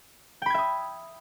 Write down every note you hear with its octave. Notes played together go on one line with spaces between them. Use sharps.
E5 G5 B5 D#6 G#6